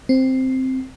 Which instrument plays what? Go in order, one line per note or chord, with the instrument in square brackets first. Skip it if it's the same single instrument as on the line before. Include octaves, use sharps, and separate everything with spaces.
[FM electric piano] C4